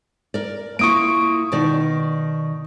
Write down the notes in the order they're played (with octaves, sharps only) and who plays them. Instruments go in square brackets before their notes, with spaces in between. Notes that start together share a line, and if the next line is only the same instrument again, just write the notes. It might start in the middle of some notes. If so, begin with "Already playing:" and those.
[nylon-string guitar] A#4 D5
[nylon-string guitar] A#3 E4 F4 [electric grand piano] C#6 D#6 D7
[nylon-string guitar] B2 D#3 D5